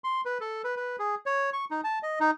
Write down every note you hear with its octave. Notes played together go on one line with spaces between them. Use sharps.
C6
B4
A4
B4
B4
G#4
C#5
C#6
D#4
A5
D#5
D#4